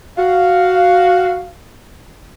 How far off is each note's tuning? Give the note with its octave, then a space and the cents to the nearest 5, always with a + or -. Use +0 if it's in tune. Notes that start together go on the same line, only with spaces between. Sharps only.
F#4 +0 F5 +0